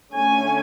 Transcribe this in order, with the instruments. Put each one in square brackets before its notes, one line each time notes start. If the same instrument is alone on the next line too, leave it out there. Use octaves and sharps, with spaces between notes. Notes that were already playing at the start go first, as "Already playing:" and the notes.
[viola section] D3 A3 C#4 G#5